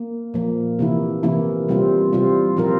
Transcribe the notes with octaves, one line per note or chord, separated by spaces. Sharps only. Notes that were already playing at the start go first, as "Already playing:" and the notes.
Already playing: A#3
A#2 F3 A#3
C3 E3 A#3 E4
C3 E3 A#3 E4
C3 G3 C4 F4
C3 G3 C4 F4
A#2 F3 C4 F4 A#4